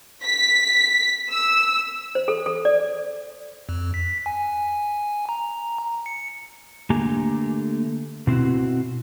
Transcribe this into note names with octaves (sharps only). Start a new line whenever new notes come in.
B6
E6
C5
A4
A4
D5
F2
B6
G#5
A#5
C#7
D3 A3 A#3 G4 G#5 A#5
B2 C4 E4 F#4